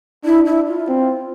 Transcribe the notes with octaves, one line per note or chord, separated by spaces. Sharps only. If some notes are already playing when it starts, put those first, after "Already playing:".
D4 E4
E4
F4
C4